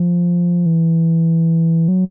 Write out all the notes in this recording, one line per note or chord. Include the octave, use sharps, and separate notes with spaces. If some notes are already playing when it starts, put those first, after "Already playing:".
Already playing: F3
E3
F#3